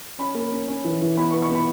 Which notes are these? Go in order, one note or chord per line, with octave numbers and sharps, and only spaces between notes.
C#4 B5
A#3
C#4
C#4
E3
E3
B3 B5
C#6
B3
C#6
B3 B5